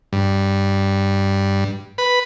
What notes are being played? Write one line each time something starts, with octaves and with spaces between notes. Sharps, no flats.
G2
B4